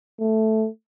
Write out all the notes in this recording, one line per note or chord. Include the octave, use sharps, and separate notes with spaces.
A3